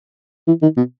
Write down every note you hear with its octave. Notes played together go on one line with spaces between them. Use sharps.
E3
D#3
B2